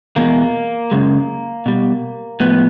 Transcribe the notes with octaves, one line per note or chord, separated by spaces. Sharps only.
E2 B2 G#3 A#3
F#2 C#3 G#3
B2 G3
A2 F3 G#3 B3